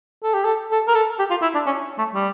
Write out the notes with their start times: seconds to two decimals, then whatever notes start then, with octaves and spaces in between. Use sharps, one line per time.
0.23 A4
0.34 G4
0.45 A4
0.71 A4
0.88 A#4
0.94 A4
1.19 G4
1.30 F4
1.42 E4
1.55 D4
1.66 C#4
1.98 A3
2.14 G3